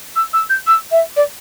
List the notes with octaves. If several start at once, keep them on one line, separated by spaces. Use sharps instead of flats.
E6
E6
G6
E6
E5
D5